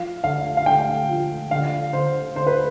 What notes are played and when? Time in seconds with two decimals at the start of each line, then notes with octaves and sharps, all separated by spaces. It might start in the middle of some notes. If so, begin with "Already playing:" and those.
Already playing: F3 F5
0.24 D3 F5
0.57 F5
0.66 D3 G5
1.09 F3
1.51 D3 F5
1.93 D3 C5
2.35 D3 C5
2.47 B4